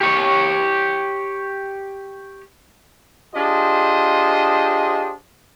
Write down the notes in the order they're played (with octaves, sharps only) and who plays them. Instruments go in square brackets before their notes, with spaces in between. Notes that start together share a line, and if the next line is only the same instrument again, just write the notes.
[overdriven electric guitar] G4 C#5
[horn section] D4 F4 G4 G#4 C5 D#5